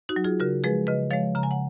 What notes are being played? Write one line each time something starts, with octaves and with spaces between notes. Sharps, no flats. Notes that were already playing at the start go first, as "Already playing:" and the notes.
D#4 F#4
F#3
F4 G#4
C#3 F#4 A#4
F3 G#3 G#4 B4
C#3 B4 D#5
F3 G#3 C#5 F5
C#3 A#5
G#5
F#5